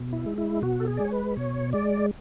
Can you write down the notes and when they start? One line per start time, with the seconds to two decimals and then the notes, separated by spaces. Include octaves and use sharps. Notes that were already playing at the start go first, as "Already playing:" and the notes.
Already playing: B2
0.13 E4
0.26 G#3
0.38 E4
0.62 B2 F#4
0.80 A4
0.88 G#4
0.97 D5
1.00 G#3 C#5
1.12 B4
1.37 B2 C#5
1.73 G#3 D5